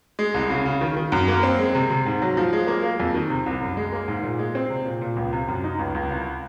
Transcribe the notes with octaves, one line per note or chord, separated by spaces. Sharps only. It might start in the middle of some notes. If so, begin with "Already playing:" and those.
G#3
C2
C#3
C#3
D#3
D#3
F#2
A#3
C4
G#3
C3
C3
G#2
F#3
F3
G#3
A#3
A#3
F2
D#3
C3
C2
F#2
G#3
A#3
G#2
A#2
G#3
C4
C3
A#2
A#2
C#2
C3
F#2
D#4
C#2
C#2
C2